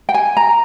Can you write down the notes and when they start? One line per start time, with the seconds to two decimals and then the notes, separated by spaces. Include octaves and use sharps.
0.09 G5
0.14 G#5
0.37 A#5